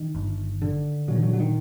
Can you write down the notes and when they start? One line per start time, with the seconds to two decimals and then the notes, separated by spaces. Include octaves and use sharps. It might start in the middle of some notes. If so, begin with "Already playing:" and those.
Already playing: D#3
0.15 G1
0.62 D3
1.08 A#2 F#3
1.15 D#3
1.23 D3 F#3
1.33 F#3
1.39 D#3